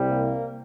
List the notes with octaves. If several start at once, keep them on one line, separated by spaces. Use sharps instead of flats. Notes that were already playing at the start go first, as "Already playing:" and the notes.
Already playing: C2 C3 G3
A#3